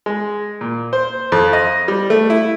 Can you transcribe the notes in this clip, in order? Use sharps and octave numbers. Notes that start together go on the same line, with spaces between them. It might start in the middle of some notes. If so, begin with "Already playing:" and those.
G#3
A#2
C5
F2
D#5
G3
A3
E4